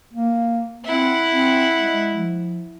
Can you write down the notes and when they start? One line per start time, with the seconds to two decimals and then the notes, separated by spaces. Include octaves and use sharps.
0.13 A#3
0.84 C4 E4 F#5
1.30 C4
1.76 G#3
2.15 F3